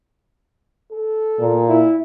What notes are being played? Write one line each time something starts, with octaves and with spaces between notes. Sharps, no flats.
A4
A#2
E4